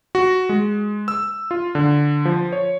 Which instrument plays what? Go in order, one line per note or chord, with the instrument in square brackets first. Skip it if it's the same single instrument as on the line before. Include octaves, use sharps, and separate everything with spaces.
[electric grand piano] F#4
G#3
E6
F4
D3
F3
C#5